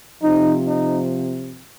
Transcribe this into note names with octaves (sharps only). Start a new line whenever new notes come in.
C3 F3 D#4
D#4